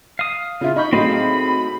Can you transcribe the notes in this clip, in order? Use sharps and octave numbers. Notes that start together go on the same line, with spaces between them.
F5 D#6
C#3 E4 F4
D#4 B5 C#6 G6
A2 F#3 C4 D#4 G#4 F5